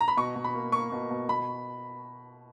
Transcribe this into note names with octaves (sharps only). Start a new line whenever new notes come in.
A#5
B5
B2 C#6
B2
B5
A#3
A#3 C#6
B2
B2
B2 B5